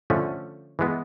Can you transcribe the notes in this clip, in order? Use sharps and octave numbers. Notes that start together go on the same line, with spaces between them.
D3 F3 A3 C#4
E3 G#3 B3